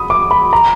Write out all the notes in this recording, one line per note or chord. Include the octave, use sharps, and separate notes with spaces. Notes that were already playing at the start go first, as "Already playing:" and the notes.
Already playing: B5 D#6
D6
B5
A#5